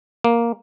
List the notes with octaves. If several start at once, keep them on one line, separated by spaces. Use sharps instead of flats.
A#3